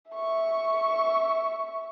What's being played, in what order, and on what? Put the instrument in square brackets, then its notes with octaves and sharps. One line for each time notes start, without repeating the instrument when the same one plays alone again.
[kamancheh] E5 C#6